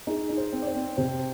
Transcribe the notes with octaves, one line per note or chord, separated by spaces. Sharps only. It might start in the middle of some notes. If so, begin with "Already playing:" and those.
D#4 G#4
D#4
C5
C4
D5
C5
C4
C3 C5